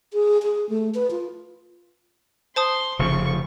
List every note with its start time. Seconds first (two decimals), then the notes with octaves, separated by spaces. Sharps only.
0.13 G#4
0.43 G#4
0.69 A3
0.94 B4
1.11 F4
2.56 C5 A5 C6 D#6
2.99 F1 C#3 F3 C#6